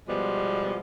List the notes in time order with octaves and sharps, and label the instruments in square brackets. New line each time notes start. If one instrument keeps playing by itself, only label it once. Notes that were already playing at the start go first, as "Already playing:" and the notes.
[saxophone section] B2 F3 G3 G#3 B3